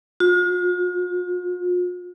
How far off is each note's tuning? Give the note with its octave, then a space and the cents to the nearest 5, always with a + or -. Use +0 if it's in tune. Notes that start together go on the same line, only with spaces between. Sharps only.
F4 +45